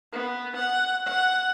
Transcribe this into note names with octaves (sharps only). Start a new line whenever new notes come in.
B3
F#5
F#5